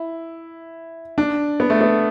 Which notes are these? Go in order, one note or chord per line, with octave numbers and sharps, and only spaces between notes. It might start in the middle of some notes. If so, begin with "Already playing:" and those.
Already playing: E4
D4
B3
A3
B3